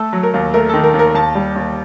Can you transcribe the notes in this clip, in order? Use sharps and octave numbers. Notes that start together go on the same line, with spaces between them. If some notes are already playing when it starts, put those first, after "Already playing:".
Already playing: A3 A4
F#3
A#4
D#2
A3 A#4
D#3 A4
A#4
D#2
A#4
D#2 A5
G3
D#2